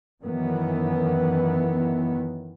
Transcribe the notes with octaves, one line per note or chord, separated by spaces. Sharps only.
F#2 D#3 E3 B3